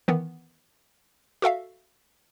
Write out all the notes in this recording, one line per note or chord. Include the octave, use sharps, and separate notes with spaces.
D#3 E3 B3
F#4 A4 E5 F5